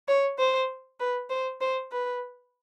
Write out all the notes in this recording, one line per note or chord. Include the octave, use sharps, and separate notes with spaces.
C#5
C5
B4
C5
C5
B4